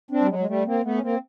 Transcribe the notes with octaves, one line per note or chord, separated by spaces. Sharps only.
C4 D4
G3
F#3 G#3
G#3
G3 A3
A#3 C4
A3 B3
C#4
A#3 C4